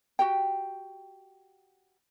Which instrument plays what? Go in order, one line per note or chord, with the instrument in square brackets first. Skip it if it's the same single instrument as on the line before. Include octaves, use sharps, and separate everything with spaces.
[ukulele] F#4 G4 G5